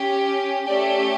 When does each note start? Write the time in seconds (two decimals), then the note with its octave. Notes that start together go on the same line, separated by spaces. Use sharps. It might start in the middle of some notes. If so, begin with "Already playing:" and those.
Already playing: C#4 G4
0.66 A3 C#4 G4 D5